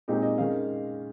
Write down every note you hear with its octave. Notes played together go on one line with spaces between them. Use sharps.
A#2 G#3 C4 D#4 G4
D#5
D#3 G#3 C#4 F5